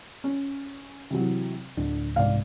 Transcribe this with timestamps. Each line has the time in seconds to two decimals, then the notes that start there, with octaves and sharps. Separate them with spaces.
0.24 C#4
1.10 C3 E3 F#3
1.77 D1 D3
2.16 C2 G#2 D5 F5